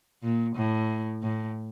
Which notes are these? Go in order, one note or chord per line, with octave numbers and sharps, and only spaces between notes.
A#2
A2
A2